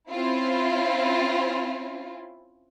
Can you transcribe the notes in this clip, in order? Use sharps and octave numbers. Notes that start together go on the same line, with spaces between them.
C4 C#4 E4 F4